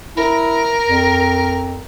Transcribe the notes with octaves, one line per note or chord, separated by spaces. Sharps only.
E4 A#4
F2